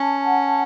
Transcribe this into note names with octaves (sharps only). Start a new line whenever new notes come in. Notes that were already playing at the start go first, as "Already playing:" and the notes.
Already playing: C#4 A5
F#5